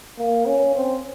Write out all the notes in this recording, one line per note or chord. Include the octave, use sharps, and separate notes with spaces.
A#3
C#4
C4